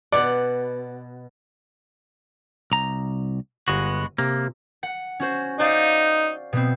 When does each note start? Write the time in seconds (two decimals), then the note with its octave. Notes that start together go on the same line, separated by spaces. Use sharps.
0.12 B2 D5 F#5
2.72 C2 A#5
3.68 G1 G#3 B3 F#4
4.18 C3 A#3
4.83 F#5
5.20 C#4 F#4 C5
5.60 D#4 C5 D5 F5
6.53 B2 B3 C4